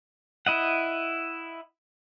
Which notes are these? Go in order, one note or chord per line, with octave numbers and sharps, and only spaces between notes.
E4 D#5 F#5